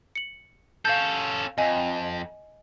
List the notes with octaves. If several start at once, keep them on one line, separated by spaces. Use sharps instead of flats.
C#7 F#7
C#4 A4 F5 G6
F2 D#5 G#5